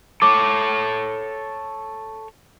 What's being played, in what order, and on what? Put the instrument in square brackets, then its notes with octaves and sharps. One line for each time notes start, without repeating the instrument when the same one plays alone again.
[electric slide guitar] A4 C#5 [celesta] D6